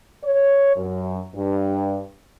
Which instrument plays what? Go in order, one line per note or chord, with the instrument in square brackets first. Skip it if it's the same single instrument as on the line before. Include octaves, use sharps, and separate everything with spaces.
[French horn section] C#5
F#2
G2